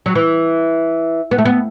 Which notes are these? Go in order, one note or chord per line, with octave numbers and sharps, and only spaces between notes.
F#3
E3
B3
A3
B3